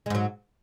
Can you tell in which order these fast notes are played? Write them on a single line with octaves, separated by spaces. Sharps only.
G#3 G#2 F#3